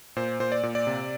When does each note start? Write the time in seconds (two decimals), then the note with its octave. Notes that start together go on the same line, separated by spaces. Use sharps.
0.16 A#2 C5
0.40 A#2 C5
0.52 D5
0.63 A#2
0.75 D5
0.87 C3